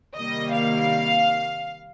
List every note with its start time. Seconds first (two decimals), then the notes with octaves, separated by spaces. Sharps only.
0.16 C3 D#3 G3 A#3 D#5
0.54 F5